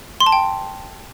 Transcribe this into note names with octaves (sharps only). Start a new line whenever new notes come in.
C6
A5
G5